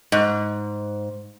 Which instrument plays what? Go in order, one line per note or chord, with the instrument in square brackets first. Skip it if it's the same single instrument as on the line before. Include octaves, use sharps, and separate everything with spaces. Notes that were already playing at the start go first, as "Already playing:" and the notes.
[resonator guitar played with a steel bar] G#2